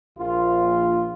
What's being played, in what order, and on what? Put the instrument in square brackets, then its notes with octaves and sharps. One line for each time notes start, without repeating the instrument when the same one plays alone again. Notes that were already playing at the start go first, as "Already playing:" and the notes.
[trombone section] A#1 F4